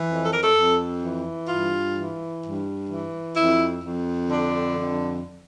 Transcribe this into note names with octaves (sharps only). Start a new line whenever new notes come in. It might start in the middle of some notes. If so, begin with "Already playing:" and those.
Already playing: E3
F2
A4
A#4
A4
F2
E3
G2 F4
E3
G2
E3
F2 E4
F2
D3 D4
F2